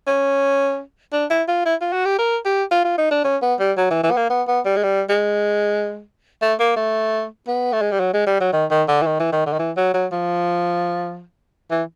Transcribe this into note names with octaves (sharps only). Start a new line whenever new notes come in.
C#4
D4
E4
F4
E4
F4
F#4
G4
A#4
G4
F4
F4
D#4
D4
C#4
B3
G3
F#3
E3
E3
B3
A#3
B3
B3
G3
G#3
G3
G#3
A3
A#3
A3
B3
A3
G#3
G3
F#3
G#3
G3
F#3
D#3
D#3
D3
E3
D#3
E3
D#3
D3
D#3
E3
F#3
F#3
F3
E3